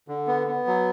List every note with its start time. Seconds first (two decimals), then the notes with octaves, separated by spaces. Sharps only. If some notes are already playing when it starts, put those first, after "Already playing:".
0.08 D3
0.27 B3
0.47 B3
0.67 F#3